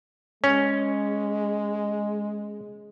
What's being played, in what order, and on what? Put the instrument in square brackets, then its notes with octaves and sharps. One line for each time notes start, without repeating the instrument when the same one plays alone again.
[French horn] G#3 [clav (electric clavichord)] C#4